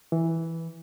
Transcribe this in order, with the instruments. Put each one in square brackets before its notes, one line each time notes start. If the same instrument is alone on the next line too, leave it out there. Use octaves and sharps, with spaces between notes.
[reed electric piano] E3